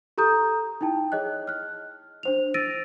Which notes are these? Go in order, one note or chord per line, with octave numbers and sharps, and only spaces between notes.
G4 A4 A#5 D#6 G6
D#4 E4 G5 A5
G#4 C#5 D#5 F#6
F6 F#6
D4 C5 F7
E6 A6 A#6 D7 D#7